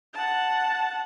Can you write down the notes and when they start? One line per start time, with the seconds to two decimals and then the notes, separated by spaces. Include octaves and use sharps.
0.14 F#5 A5